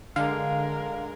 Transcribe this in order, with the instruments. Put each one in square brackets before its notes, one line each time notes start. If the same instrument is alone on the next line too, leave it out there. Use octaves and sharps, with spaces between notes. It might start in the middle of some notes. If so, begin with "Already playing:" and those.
[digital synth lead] D3 [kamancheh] G#3 A#4 [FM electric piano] F5